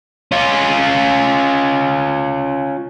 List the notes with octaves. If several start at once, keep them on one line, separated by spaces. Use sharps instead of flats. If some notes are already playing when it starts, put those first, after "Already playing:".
C#4 F4